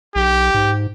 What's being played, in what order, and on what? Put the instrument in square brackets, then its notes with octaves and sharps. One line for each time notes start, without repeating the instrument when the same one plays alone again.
[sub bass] B1 [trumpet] G4
[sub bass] G#2